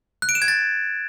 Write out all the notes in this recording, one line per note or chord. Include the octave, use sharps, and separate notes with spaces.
F#6
D7
E7
G#6
A6